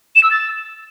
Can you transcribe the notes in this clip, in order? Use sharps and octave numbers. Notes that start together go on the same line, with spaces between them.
E7
E6
A6